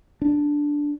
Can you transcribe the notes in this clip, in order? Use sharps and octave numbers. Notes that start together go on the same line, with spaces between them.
D4